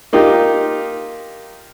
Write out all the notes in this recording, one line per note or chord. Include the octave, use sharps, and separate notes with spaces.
A#3 D#4 F4 G4